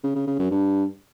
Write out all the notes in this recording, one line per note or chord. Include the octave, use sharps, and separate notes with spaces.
C#3
C#3
C#3
F#2
G2